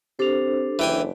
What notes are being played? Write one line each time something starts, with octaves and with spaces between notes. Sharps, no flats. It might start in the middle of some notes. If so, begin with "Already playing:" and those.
C4 D4 G4 A4 C5 F7
F#1 E3 G5 G#5